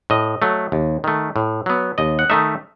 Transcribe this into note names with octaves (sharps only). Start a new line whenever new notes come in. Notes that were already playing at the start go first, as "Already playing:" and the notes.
A2 D#5
F#3 A3
D#2
D#3 A3
A2
F#3 B3
D#2 D#5
F#5
D#3 A3 D#4 E5